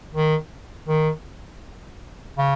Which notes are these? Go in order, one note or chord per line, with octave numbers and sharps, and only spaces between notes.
D#3
D#3
C#3